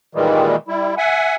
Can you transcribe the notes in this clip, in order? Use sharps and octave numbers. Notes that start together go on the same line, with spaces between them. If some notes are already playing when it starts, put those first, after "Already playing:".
A#2 D#3 E3 G3 G#3
G3 E4
E5 F#5 G#5